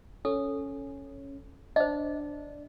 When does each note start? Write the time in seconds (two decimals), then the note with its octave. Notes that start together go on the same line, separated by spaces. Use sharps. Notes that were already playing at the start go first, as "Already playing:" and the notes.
0.25 C#4 A4
1.76 D4 C5 D#5